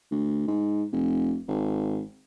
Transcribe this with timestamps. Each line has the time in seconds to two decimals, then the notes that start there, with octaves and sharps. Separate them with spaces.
0.11 D2
0.47 G#2
0.92 F1
1.48 G#1